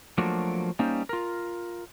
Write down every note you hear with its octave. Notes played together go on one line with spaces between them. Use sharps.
F3 F#3 A3 A#3 D4 F#4
G3 A#3 C#4 D#4 C5
F4 A#4